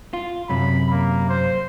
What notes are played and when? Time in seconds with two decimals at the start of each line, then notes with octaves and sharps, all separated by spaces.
0.13 F4
0.50 F#2 C3 B5
0.90 A#3
1.29 C5